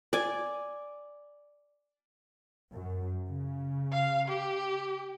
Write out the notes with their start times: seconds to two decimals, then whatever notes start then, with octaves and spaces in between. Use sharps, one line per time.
0.13 D5 G#5
2.73 F#2
3.28 C#3
3.92 F5
4.28 G4